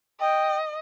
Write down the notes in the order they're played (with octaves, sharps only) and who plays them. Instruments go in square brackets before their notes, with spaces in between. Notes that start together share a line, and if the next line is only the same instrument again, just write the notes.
[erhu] D#5 [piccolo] G5